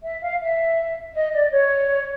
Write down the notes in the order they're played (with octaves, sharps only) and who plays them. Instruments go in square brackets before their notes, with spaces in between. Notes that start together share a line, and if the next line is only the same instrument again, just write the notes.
[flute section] E5
F5
E5
D#5
D5
C#5